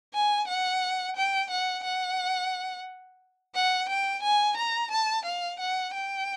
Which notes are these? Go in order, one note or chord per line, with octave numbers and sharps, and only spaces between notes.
G#5
F#5
G5
F#5
F#5
F#5
G5
G#5
A#5
A5
F5
F#5
G5